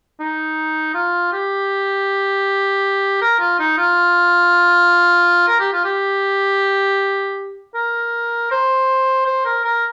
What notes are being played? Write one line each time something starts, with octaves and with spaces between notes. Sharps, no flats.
D#4
F4
G4
A#4
F4
D#4
F4
A#4
G4
F4
G4
A#4
C5
C5
A#4
A#4